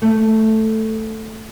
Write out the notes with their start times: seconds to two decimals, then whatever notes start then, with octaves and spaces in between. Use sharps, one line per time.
0.02 A3